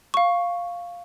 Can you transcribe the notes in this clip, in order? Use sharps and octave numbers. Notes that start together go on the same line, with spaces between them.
F5 C#6